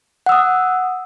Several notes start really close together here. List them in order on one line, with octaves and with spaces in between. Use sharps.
F#5 E6 D#6